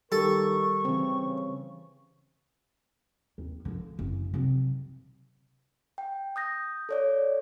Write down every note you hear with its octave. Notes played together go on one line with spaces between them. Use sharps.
D#3 G3 G4 A4 A#4 C#6
C#3 E3 C4
D#2
D3 F3
F#1
C3 F#3
G5
D#6 G6 A#6
A4 C#5 D5